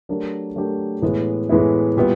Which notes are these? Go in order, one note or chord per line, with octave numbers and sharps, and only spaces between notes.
F#3 A3 D4 G4 A#4
F#3 A3 D4 G4 A#4
A2 E3 G#3 B3 E4
A2 E3 G#3 B3 E4
A#2 G3 B3 E4